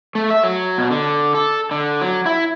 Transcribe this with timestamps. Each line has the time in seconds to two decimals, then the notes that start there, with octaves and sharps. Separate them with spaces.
0.15 A3
0.30 E5
0.43 F#3
0.78 B2
0.91 D3
1.35 A4
1.71 D3
2.01 F#3
2.26 E4